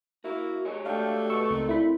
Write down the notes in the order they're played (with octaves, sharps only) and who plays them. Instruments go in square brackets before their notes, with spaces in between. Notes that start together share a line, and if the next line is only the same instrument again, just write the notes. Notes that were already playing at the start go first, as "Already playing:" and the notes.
[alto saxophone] A#3 [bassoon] E4 [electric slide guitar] F#4
[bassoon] G#3 [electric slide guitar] F#4 G4 C#5
[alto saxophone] A3 [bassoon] D4 [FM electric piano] F5 G5
[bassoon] B2 [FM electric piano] C#6 E6
[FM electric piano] C#2 [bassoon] D#3 [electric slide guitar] C4
[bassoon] A#2 [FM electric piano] E4 B5